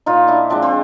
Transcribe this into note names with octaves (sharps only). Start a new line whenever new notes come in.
A#2 D#4 F4
D4 E4
F3 G#3 C4 D4
C4